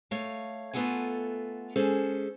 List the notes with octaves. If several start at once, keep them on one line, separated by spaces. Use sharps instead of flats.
A3 C#5 F5
A3 B3 F4 A4 F#5 G#5
G#3 C#4 G#4 A4 C5